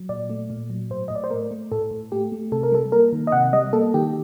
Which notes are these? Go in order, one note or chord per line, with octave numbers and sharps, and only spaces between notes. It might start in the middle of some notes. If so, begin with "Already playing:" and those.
Already playing: F#3
A#2 D5
A3
A#2
F#3
A2 C5
A2 D#5
D5
C5
A3 A#4
A3
A2 A4
A2
A3 G4
A3
C3 A4
A#4
G3 A4
A#3 A#4
D#3
D#5
C3 F#5
G3 D#5
A#3 A4
D#3 G4